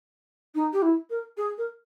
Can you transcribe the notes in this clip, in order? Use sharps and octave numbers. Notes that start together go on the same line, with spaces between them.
D#4
G4
E4
A#4
G#4
A#4